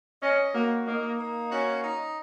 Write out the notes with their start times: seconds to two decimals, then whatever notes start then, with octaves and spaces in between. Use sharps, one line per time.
0.22 C#4 D#5
0.54 A#3 F#4
0.87 A#3 D#4
1.19 A#3
1.52 C#4 F#4
1.84 D#4